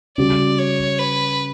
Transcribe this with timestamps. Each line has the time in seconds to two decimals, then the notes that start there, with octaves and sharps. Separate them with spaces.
0.17 C#3 G3 C#4 F#4 D5
0.58 C#5
0.99 B4